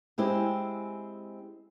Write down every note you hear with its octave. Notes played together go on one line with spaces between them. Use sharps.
G#3 C4 E4 G4 G#4